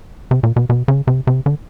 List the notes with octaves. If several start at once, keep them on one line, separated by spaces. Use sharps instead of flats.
C3
A#2
B2
B2
C#3
C3
C3
D3